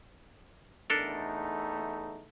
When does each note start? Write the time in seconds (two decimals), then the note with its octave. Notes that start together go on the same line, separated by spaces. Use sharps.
0.90 E2 A3 D4 D#4 A4 A#4